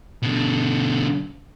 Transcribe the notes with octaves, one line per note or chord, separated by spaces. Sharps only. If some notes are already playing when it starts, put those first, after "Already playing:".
B2 D3